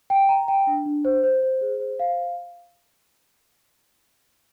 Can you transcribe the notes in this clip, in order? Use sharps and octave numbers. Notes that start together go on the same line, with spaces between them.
G5
A#5
G5
D4
D4
C5
C5
C5
G#4
C5
F5